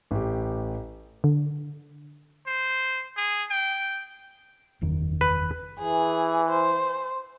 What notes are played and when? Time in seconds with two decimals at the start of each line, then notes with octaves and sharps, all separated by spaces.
0.11 A1 G4
1.24 D3
2.47 C5
3.17 G#4
3.50 G5
4.81 F#1 E2 D#3
5.21 B4
5.79 E3 G#4
6.49 C5